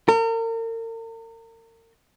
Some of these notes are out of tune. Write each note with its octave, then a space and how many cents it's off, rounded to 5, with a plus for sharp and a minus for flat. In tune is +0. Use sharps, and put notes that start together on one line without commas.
A#4 -40